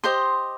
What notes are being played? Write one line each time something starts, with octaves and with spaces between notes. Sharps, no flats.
G4 C5 D#5 C6